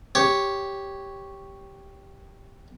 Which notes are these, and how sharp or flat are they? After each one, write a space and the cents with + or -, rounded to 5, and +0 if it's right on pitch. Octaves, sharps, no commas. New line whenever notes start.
G4 +0 C#5 +0